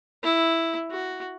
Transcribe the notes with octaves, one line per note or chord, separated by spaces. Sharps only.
E4
F#4